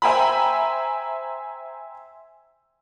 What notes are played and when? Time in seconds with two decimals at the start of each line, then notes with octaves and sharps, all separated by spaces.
0.02 C5 E5 G5 G#5 A#5 B5